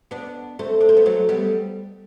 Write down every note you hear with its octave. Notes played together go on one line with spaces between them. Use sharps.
B3 D4
A3 C4
D4
C4
B3
F#3 A3
G3 B3